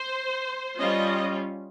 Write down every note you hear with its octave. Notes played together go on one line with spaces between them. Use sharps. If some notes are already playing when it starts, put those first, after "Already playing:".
Already playing: C5
G3 C#4 F4 D#5